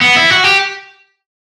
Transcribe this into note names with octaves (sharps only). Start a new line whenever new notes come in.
B3
E4
F#4
G4